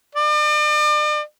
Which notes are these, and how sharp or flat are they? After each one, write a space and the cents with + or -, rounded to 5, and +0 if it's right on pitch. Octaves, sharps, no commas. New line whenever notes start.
D5 +40